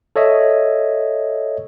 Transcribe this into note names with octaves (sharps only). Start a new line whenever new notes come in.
A4 C#5 D#5 E5